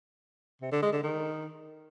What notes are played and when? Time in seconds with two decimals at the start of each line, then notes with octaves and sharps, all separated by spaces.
0.61 C3
0.72 D3
0.82 G#3
0.93 D3
1.03 D#3